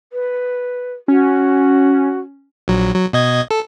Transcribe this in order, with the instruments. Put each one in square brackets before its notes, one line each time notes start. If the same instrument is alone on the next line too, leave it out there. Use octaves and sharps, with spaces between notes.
[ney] B4
[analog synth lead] C#4 [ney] F#4
[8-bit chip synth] A#1 F#3
F#3
B2 D#5 G#6
A4